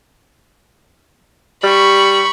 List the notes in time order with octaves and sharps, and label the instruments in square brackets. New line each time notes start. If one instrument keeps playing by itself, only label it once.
[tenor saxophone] G3 [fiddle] B5 C#6